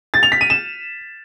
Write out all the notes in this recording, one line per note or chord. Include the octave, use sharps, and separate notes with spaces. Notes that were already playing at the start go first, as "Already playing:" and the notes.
A6
F7
B6
D#7
E7